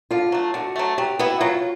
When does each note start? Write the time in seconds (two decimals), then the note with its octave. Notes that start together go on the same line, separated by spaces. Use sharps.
0.11 D3 F4
0.32 F#3 A3
0.54 D3 F#4
0.76 F#3 A3
0.98 F#3 G4
1.19 B3 E4 F#4
1.40 F#3 F4